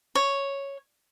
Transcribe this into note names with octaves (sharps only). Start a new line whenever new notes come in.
C#5